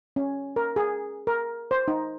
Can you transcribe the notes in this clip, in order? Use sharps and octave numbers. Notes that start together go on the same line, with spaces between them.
C#4
A#4
G#4
A#4
C5
D#4